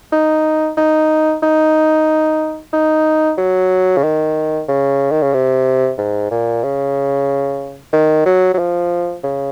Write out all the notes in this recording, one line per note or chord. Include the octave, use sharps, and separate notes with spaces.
D#4
D#4
D#4
D#4
F#3
C#3
D#3
C#3
D#3
C#3
C3
G#2
A#2
C#3
D#3
F#3
F#3
F3
C#3